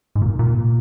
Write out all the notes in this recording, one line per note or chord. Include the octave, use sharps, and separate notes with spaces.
G#2
A#2
A#2